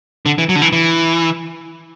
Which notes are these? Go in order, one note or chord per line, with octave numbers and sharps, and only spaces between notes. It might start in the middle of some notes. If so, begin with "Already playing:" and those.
D3
E3
F#3
D3
E3
E3